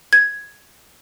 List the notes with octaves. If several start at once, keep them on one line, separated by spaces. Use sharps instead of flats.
G#6